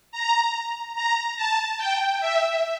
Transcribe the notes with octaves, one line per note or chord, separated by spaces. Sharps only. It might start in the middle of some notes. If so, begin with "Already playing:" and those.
A#5
A#5
A5
G5
E5